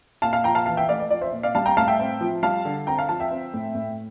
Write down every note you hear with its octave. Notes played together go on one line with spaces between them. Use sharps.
A#2 F5 A5
F5 A5
F3 G5 A#5
F5 A5
E3 F5 A5
E5 G5
A3 D5 F5
D5
F3 D5
C5 E5
A#2
D5 F5
G3 F5 A5
G5 A#5
A2 F5 A5
E5 G5
C4
F3
G3 F5 A5
D3
C4 G5 A#5
F5 A5
F3 F5 A5
E5 G5
C4
A2
A2